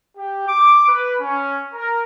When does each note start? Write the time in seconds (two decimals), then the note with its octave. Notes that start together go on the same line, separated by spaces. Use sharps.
0.16 G4
0.48 D6
0.87 B4
1.20 C#4
1.73 A#4